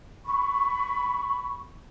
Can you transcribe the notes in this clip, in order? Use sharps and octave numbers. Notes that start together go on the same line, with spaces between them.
B5 C#6